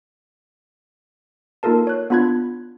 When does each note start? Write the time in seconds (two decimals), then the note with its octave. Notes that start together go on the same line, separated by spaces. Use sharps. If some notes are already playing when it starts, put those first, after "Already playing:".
1.63 A#3 D#4 F4 A4 A#4 A5
1.87 C#5 F#6
2.10 B3 D4 F4 B5 F#6 G#6